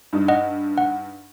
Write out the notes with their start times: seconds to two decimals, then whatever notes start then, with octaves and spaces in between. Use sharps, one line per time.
0.13 G2 D#4
0.28 D#5 F#5
0.78 F#5